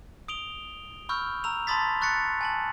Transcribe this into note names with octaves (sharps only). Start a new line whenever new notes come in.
D#6 D7 F7 G7
B5 C#6 E6 F6 G6
A#5 E6 F7
A5 B5 C6 D#6 A6 B6
C#6 F#6 A6 B6 C#7
G#5 A5 F#7